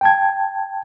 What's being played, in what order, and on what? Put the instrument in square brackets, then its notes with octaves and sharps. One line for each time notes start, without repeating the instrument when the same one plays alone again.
[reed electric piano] G5 A5 G#6